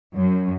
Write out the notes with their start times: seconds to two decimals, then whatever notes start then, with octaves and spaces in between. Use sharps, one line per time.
0.14 F#2